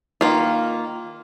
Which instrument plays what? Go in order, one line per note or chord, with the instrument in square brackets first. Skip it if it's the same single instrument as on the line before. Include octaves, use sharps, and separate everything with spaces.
[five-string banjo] D#3 F3 A#3 F4